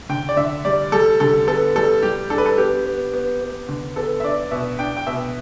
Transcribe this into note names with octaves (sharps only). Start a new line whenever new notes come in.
D3 G5
D5
D3 E5
G3 D5
G3 A4
D3 A4
B3 A4
G3 A4
G3 G4
D4 A4
B4
A4
B3 G4
B3
B3
B3
D3
B3 A4
E5
D4 D5
B2 E5
D4 G5
G5
B2 E5